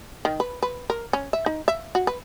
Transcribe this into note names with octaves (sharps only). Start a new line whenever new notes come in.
D#3
B4
B4
A#4
C#4
E5
D#4
E5
F#4
B4